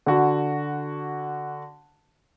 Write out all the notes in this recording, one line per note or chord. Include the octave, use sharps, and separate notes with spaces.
D3 F#4